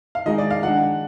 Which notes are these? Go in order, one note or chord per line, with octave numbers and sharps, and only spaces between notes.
F5
D#3 G#3 D#4 D#5
D5
F5
D#3 G#3 D4 F#5